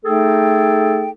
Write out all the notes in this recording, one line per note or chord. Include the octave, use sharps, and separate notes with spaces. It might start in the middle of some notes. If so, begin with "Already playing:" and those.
A3 D#4 G#4 A4 G5